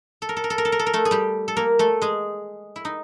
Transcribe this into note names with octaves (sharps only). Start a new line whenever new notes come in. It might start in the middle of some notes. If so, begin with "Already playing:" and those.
A4
A#4
A4
A#4
A4
A#4
A4
A#4
A4
A#4
A3 A4
G#4
G3 G4
A4
A#3 A#4
A3 A4
G#3 G#4
E4
D#4